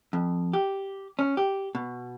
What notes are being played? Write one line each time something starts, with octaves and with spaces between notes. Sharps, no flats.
F2
G4
C#4
G4
B2